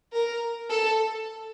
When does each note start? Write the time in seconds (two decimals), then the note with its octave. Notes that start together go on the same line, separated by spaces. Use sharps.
0.14 A#4
0.70 A4